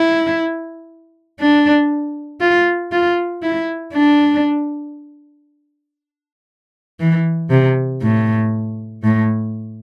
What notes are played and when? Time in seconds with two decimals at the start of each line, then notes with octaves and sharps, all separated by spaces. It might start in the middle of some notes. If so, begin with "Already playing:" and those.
Already playing: E4
1.40 D4
2.41 F4
2.92 F4
3.42 E4
3.93 D4
7.00 E3
7.50 C3
8.02 A2
9.03 A2